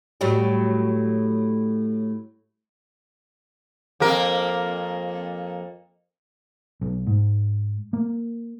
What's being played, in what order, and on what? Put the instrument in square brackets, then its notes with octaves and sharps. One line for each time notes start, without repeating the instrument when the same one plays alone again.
[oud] A2 F#3 G3
[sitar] F2 A#3 A#4
[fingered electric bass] B1
G#2
A#3